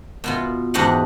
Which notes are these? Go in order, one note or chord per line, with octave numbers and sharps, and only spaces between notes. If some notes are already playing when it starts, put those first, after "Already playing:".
B2 B3 F4
E2 G#2 D4 G4 D#5 F#5